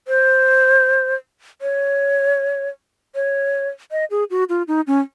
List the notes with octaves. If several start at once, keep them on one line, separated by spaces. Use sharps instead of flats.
C5
C#5
C#5
D#5
G#4
F#4
F4
D#4
C#4